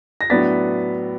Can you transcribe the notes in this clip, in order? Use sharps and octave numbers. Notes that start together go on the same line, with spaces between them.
A#6
A2 F#3 B3 D4 A6 B6